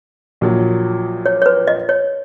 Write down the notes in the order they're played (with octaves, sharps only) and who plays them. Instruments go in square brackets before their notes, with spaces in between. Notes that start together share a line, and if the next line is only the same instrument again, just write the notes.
[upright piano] A#1 A#2 F#3
[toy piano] C#5
C#5
B4
D#5
C#5